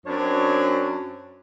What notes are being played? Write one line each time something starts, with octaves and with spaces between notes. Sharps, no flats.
F#2 C4 D4 C#5